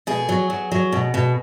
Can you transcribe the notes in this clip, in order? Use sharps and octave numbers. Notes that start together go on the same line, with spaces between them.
B2 G#4
F#3
F#3
F#3
B2
B2